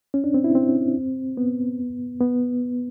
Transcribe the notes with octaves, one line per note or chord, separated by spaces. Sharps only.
C#4
D4
C4
E4
C4
B3
B3